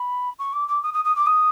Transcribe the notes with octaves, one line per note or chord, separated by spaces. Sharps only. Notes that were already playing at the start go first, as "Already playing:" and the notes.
Already playing: B5
C#6
D6
D6
D#6
D#6
D#6
D6
D#6